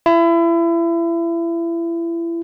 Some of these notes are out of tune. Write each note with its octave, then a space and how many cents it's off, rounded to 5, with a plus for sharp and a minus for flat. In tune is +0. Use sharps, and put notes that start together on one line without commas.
E4 +30